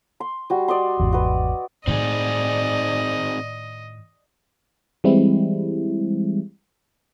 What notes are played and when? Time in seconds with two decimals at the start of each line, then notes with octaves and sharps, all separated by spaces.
0.20 C6
0.50 G3 F#4
0.68 D5 D#5 C6
1.00 G#1 E2
1.12 F#4 B4
1.87 A2 D#3 C4 D#4 G#4 D5 D#5
5.04 E3 G3 G#3 C4 E4